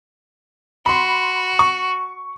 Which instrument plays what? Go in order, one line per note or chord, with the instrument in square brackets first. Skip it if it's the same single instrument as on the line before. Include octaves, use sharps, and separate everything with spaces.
[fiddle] F#4 [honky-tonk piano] B5 C6
[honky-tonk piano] C#6